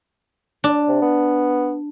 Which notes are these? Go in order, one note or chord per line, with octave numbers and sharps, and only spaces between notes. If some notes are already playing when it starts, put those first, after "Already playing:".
D4
C3
B3